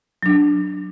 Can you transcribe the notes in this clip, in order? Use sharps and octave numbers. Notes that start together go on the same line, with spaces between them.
F#3 D4